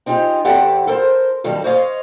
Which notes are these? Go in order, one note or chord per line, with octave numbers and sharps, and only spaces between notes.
C4 D#4 F4 G4 G#4
E2 C4 E4 G4 A4 F#5
A4 A#4 C5
G2 D#3 F#3 G3 A4
C5 C#5 D#5 F5